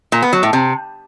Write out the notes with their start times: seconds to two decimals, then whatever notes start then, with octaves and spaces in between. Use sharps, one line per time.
0.12 A#2
0.22 B3
0.33 F#3
0.43 A2
0.53 C3